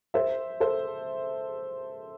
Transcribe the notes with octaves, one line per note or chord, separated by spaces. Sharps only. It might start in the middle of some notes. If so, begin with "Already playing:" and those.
C5 E5
A4 C5